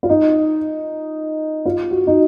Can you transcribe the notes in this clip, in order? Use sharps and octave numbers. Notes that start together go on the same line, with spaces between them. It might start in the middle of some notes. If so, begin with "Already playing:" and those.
F4
D#4
F4
F#4
D#4